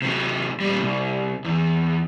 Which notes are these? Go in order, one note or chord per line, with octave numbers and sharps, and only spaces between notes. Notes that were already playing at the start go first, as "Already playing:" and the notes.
C3 F#3
A#2 G3
C2
E2